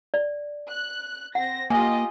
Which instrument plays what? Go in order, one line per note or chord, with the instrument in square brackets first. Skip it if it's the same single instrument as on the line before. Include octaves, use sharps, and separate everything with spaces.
[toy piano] D5
[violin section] F#6
[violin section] C4 A#6 [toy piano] F#5
[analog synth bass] A#3 [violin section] F4 G4 D#5 [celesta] G#5